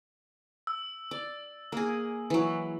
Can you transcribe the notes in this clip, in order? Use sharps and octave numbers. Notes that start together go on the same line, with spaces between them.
E6
D5
A#3 G#4
E3 F#3